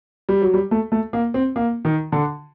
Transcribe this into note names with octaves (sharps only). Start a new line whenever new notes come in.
G3
F#3
G3
A3
A3
A#3
C4
A#3
D#3
D3